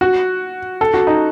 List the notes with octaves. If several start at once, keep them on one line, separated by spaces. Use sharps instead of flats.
F#4
A4
F#4
D#4